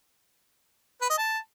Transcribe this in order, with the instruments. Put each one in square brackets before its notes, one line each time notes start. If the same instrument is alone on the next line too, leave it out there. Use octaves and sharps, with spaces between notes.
[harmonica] B4
D#5
A5